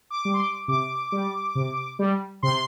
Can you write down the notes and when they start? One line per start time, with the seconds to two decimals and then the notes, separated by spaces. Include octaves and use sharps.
0.10 D6
0.25 G3
0.34 C6
0.39 D6
0.68 C3 D6
1.12 G3
1.55 C3
1.99 G3
2.43 C3 C6